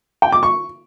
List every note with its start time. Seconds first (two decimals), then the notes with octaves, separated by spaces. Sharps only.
0.22 G5
0.32 D6
0.43 C#6